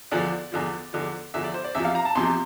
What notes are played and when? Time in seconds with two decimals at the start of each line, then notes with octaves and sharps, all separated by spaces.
0.12 E2 D3 F3 D5
0.52 E2 D3 F3
0.93 E2 D3 F3
1.34 E2 D3 F3 E5
1.44 D5
1.54 C5
1.64 D5
1.75 E2 C3 F3 E5
1.85 F5
1.95 A#5
2.05 A5
2.15 E2 C3 F3 C6